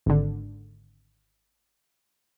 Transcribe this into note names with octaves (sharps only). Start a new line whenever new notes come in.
G#1 D3